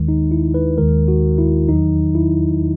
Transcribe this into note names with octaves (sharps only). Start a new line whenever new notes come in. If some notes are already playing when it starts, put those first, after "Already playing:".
Already playing: D#2 D#3 G#3
D#4
E4
B4
D#2 D#3 G#3 A#4
F#4
E4
E2 D#3 F#3 D#4
E4